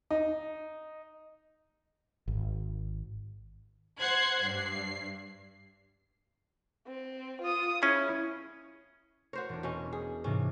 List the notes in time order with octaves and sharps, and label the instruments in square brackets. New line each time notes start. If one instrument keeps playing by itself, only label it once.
[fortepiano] D#4
[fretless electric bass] G#1
[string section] C5 F#5 F#6 G#6 C7
G2 C7
[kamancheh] C4
F4 D#6
[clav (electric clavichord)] C#4 G#4 [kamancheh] E4
[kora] F#4 C5 C#5 [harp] A#4
[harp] E1 D4
[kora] B2 C#4
G#4
[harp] G#2 C3 E3 [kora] C#4